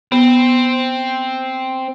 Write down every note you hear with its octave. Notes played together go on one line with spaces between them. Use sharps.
B3 C4